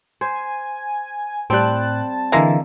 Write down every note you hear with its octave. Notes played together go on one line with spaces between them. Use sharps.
C5 G#5
A2 G3 C4 A5 F#6
D3 E3 G#3 A#3 E5